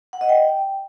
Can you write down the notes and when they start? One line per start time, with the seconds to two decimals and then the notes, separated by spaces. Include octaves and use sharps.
0.13 F#5
0.21 D#5
0.29 G5